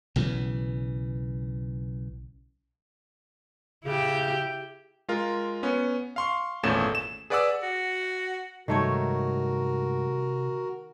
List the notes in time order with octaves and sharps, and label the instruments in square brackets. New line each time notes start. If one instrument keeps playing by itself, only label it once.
[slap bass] B1 C#3 E3
[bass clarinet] C#3 [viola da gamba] E4 G4
[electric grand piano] G#3 F4 A#4
B3 C#4
F5 C6 C#6
G#1 E2 A#2 A3 C#4 E7
E7
G#4 B4 D5 F#5 D6 E6
[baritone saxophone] F#4
[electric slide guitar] G2 G#3 [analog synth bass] C3 [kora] D#3 A3 C#5 [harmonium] F#4 A#4